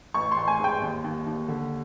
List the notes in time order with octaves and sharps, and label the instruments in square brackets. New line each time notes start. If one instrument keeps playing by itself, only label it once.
[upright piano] A1 C#6
C6
A1
G#5
G#2 G5
D#2
D#2
D#2
D3